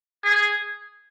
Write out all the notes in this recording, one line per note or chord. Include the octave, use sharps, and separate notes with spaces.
G#4